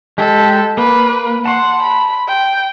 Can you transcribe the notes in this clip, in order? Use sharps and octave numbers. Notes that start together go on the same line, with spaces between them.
G#3 G4 A4
A#3 B4
F#5 A5 C6
B5
G5